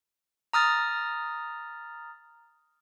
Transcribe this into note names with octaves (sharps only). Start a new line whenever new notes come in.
A#5 D#6 F6 A6